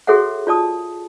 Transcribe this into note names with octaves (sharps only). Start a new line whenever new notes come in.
F#4 G#4 A4 C#5 E5 F#5
F4 D5 A5 D#6